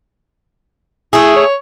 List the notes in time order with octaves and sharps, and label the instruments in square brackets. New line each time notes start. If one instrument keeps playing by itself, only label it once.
[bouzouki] A3 G#4 [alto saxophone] E4
[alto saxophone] C#5